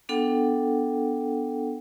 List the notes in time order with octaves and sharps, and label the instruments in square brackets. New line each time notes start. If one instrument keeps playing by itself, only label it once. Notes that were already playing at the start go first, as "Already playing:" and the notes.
[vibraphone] B3 D4 A4 F#5 G5